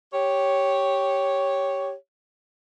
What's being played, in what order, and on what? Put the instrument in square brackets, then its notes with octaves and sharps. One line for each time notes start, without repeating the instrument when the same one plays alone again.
[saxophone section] G4 C#5